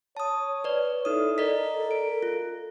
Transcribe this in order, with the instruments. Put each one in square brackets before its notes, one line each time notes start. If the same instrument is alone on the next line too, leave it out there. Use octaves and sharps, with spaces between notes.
[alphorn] C#5 [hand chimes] A5 D#6
[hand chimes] B4 D5
[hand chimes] D#4 D#6 [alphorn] E4 [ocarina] A4
[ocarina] A4 [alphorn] A#4 [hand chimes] D5 D#5 B6
[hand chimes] D7
F4